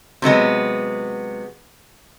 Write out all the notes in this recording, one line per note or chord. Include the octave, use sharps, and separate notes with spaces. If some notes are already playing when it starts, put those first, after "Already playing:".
C3 F#3 G#3 B3